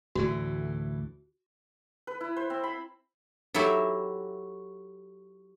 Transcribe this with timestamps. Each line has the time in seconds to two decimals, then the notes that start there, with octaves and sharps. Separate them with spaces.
0.15 D2 A2 E3 F#4
2.07 B4
2.21 E4
2.37 C5
2.50 C4
2.64 B5
3.54 F#3 E4 F#4 G4 A4 E5